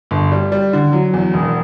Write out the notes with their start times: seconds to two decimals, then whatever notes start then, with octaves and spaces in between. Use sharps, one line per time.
0.11 G1
0.32 G3
0.52 G3
0.73 D3
0.93 F#3
1.13 E2
1.34 E1